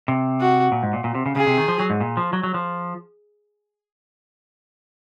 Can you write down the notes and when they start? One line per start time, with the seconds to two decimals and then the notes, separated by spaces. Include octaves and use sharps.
0.08 C3
0.40 F#4
0.72 A#2
0.83 G#2
0.93 A#2
1.04 A#2
1.15 C3
1.26 C#3
1.36 C#3 G#4
1.47 C3
1.57 D#3
1.68 F3
1.80 F#3
1.90 G#2
2.01 A#2
2.17 F3
2.33 F#3
2.43 F#3
2.54 F3